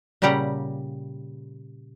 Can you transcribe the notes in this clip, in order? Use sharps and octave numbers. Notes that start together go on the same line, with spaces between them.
A#2 C#3 G3 G4 F#5 A#5